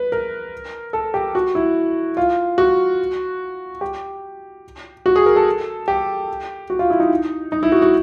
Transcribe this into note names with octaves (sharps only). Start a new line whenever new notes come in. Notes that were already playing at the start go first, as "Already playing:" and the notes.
Already playing: B4
A#4
A4
G4
F#4
E4
F4
F#4
G4
F#4
G#4
A#4
A4
G4
F#4
F4
E4
D#4
D#4
E4
F#4
F#4